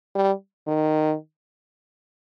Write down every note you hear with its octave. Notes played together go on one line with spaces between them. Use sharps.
G3
D#3